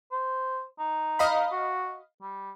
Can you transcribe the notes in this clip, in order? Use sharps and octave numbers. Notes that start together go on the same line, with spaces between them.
C5
D#4
D#5 F5 B5
F#4
G3